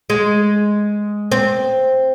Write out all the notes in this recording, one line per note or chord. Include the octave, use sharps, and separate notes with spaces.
G#3
C4